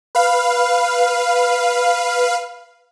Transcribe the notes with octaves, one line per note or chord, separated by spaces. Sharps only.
B4 F5